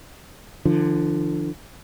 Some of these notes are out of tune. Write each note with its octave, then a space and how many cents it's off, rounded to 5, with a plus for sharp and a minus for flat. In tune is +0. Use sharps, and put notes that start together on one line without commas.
D3 +15 F3 -35